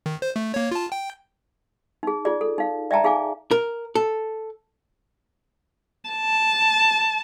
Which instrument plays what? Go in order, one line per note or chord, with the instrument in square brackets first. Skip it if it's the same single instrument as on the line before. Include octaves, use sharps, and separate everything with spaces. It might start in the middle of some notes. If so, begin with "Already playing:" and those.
[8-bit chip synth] D#3
C5
A3
A#3 C#5
F4 A5
G5
[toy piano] D#4 G#4
F4 G#4 D5
A4
D#4 F5
D5 E5 G5 A5 A#5
D#4 G#4 F5 G#5 D6
[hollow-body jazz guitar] A#4
A4
[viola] A5